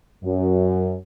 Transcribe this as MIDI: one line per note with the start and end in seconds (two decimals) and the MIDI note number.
0.23 0.93 42